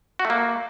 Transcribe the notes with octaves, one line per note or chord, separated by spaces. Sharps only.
F#4
A3
A#3